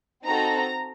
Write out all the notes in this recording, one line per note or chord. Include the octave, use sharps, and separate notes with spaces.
C4 D#4 F#4 A4 A#5